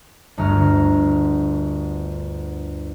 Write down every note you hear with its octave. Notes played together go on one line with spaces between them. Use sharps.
G1 D2 A#5 C#6 F6